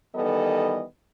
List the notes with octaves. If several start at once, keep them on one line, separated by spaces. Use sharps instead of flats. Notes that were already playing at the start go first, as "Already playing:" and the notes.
D#3 E3 G3 B3 A4 D#5